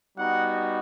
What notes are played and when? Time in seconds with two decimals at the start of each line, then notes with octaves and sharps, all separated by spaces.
0.17 G3 B3 D#4 F#4 F#5